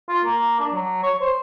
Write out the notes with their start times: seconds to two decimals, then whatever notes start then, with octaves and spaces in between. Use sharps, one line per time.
0.09 F4
0.24 A#3
0.60 D4
0.73 F#3
1.03 C#5
1.21 C5